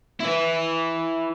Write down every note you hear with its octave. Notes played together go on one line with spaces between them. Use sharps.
E4 B4